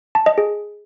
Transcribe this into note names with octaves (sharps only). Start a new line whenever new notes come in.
A5
D#5
G#4